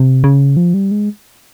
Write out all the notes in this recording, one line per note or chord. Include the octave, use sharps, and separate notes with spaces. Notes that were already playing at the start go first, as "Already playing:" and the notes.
Already playing: C3
C#3
F3
G3
G#3